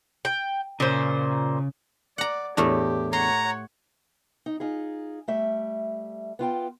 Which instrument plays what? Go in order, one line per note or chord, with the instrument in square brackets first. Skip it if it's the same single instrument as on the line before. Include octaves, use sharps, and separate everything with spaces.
[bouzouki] G5
[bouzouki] A#2 C5 [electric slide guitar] C#3
[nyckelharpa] D5 [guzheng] F#5 A#5
[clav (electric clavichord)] E2 D4 [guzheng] A2 A3 A#4 [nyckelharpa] G4
[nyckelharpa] C#5 F#5 [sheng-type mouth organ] A#5 [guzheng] C6
[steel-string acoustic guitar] D#4
D#4 F4 G#4
G3 A3 E5
B3 F4 G5